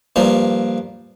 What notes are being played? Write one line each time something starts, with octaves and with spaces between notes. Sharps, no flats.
G2 F3 A#3